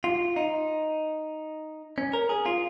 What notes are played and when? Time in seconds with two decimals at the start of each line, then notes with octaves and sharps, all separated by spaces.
0.04 F4
0.36 D#4
1.98 C#4
2.13 A#4
2.29 G#4
2.46 F4